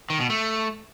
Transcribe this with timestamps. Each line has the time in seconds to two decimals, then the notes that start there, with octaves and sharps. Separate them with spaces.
0.10 D#3
0.20 B2
0.30 A3